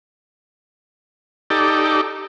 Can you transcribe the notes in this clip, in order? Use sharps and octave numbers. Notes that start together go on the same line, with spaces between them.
D#4 G4 A4 D5